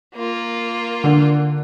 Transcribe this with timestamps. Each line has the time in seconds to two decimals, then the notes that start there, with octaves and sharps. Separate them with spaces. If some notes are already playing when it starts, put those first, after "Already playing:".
0.15 A#3 F4
1.04 D3